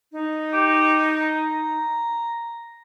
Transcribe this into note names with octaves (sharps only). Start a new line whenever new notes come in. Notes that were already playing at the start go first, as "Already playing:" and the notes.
D#4
G4
A#5